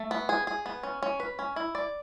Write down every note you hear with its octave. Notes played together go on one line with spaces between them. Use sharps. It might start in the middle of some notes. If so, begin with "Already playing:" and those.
Already playing: A3
B3
G#4
G#4
B3
C#4
C#4
B4
C#4
E4
D5